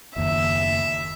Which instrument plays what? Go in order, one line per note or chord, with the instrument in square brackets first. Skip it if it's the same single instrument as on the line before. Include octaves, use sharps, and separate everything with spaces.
[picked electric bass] F#1 D#2 [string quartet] E5